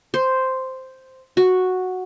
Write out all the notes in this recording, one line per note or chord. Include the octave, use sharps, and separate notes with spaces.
C5
F#4